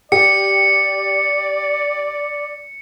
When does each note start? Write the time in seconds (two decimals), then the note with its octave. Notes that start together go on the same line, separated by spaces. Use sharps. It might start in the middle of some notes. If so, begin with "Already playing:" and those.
0.12 G4 D5 C#7